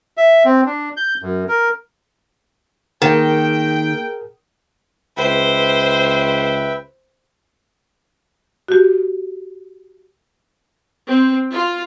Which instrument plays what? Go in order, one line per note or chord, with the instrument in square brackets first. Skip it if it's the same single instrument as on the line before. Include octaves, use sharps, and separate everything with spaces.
[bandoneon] E5
C4
D4
G6
F#2
A#4
[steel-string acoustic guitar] D#3 [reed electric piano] A#3 [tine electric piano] G#4 A#4 [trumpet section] G5
[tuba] C#2 [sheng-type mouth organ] B4 E5 G5 [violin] C5
[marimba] F#4 G4
[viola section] C4
F4